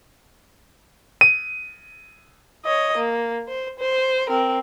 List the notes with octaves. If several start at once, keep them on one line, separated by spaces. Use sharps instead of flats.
D#7
C#5 D#5
A#3
C5
C5
C4 A#4